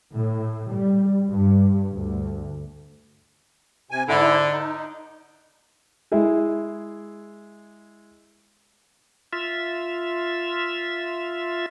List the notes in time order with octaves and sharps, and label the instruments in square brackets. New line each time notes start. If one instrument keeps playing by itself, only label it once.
[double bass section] A2
G3
G2
D2
[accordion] C3 G#5
[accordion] G#2 E4 [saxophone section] D3
[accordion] D#4
[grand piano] G#3 E4 G#4
[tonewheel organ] F4 E5